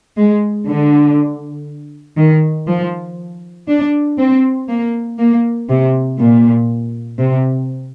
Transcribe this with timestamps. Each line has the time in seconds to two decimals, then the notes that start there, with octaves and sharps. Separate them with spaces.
0.16 G#3
0.67 D3
2.17 D#3
2.68 F3
3.68 D4
4.18 C4
4.68 A#3
5.19 A#3
5.69 C3
6.19 A#2
7.19 C3